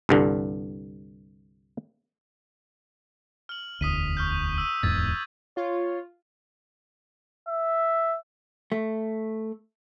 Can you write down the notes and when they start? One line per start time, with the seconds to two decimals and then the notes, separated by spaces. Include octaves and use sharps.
0.09 C2 G2 D3
3.49 F6 F#7
3.81 E1 D2 D#6 B6 D#7
4.17 C#6 F6 G6
4.58 E6 D#7
4.83 D1 E2 G#2 G#6 A6 B6
5.57 F4 C#5
7.49 E5
8.72 A3